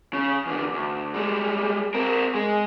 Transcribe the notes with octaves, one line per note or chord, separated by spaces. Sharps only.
C#3
E2 D3
D2
G3 G#3
C4 A#4
G#3